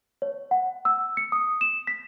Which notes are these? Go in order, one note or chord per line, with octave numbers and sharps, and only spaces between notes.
C#5
F#5
E6
C#7
D#6
E7
B6